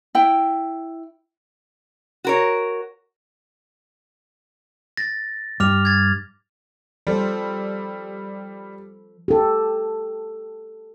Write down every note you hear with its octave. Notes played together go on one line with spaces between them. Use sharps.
E4 G5
F#4 A#4 C#5
A6 A#6
G2 D6 F6 F7
G#6 A6
F3 G3 A4 C5
G4 A4